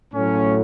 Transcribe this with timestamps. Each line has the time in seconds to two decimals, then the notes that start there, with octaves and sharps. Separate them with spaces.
0.14 A2 F#3 C#4